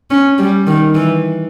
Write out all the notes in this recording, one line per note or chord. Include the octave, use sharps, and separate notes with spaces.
C#4
G3
D#3
E3